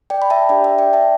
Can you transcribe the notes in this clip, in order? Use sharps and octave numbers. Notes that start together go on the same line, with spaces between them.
D5 G5
B5
E5 A5
D4 G4 D5 G5
E5
D5 G5
E5 A5